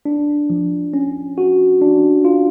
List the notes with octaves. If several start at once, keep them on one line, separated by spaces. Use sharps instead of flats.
D4
F3
C#4
F#4
D4
F4